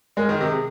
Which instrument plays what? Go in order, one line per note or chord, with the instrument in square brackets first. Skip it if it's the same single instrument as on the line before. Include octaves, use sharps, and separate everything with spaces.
[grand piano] G#3 [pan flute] A#4
[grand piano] D#3
[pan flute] A#4
[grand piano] C3 [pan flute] G#4